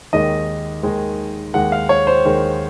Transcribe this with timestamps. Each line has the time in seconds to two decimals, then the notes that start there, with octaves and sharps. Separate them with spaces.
0.13 D#2 D#3 G#3 D#5
0.83 D#2 D#3 G#3
1.54 D#2 D#3 G#3 F#5
1.72 F5
1.89 C#5
2.07 C5
2.25 D#2 D#3 G#3